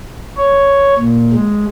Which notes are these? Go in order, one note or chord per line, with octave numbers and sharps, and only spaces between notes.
C#5
A#2
G#3